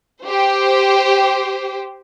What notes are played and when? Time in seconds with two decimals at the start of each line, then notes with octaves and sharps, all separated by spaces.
0.24 G4 C5